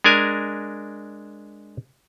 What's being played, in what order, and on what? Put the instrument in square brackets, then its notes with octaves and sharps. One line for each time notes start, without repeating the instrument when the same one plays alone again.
[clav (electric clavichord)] G#3 D4 A#4 G#5